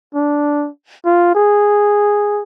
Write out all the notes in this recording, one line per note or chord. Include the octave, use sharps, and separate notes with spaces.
D4
F4
G#4